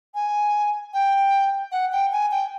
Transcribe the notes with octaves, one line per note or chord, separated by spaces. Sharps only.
G#5
G5
F#5
G5
G#5
G5